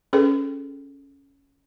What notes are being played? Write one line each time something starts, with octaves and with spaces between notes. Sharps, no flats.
C#4 G#4 A4 B4 G5